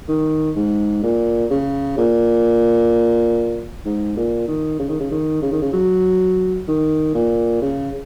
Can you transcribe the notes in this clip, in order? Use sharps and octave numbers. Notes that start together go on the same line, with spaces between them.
D#3
G#2
A#2
C#3
A#2
G#2
A#2
D#3
C#3
D#3
C#3
D#3
C#3
D#3
C#3
F#3
D#3
A#2
C#3